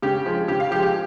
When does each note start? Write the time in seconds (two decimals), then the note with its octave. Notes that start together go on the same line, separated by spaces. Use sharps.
0.02 C#3 G4
0.26 F3 G#3
0.48 C#3 G4
0.60 F5
0.71 F3 G4
0.74 G#3
0.82 G4